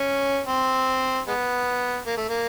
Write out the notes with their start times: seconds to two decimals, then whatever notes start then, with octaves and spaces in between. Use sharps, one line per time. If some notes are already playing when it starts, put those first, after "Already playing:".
Already playing: C#4
0.47 C4
1.27 G#3 B3
2.06 A#3
2.17 A3
2.29 A#3